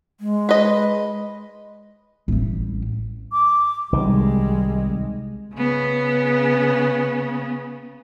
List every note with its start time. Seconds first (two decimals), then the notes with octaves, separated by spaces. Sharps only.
0.20 G#3
0.49 B4 D#5
2.28 A1 G3
3.32 D6
3.92 C2 D#3 G3 G#3
5.54 C#3 B3